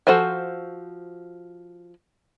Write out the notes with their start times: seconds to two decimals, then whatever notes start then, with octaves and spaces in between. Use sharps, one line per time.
0.07 F3 F#4 A4 C5 G#5